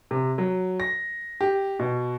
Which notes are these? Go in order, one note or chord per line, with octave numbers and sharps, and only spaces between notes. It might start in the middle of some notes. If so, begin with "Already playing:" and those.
C3
F#3
A#6
G4
B2